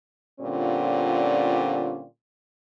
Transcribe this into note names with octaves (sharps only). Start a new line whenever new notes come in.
A#2 D3 G3 C4 C#4 F4